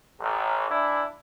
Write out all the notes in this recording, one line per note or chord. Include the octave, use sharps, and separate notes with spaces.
A1
E3 D4 E4